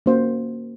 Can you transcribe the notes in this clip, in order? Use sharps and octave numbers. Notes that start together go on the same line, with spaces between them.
A#3 C#4 F#4 C5 F5